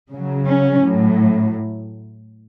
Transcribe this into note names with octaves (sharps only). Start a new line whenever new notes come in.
C#3 F#3
C#4
A2 F#3